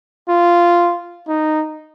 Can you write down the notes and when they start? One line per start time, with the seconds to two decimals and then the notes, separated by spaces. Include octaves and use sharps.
0.29 F4
1.28 D#4